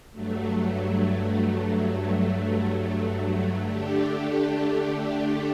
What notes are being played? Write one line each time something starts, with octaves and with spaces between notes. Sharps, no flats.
G2 F#3 A3
D3 A3 D4 G4